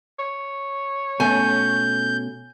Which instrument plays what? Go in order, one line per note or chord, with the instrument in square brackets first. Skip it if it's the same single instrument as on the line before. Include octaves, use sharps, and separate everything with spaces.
[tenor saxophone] C#5
[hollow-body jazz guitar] B2 A3 C#4 [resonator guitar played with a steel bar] G#5 [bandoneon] G6